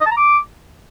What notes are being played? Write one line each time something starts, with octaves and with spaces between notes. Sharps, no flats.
D#5
A5
A#5
D6